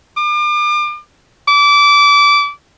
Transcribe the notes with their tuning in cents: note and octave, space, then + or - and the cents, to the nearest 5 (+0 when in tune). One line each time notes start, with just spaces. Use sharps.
D6 +40
D6 -25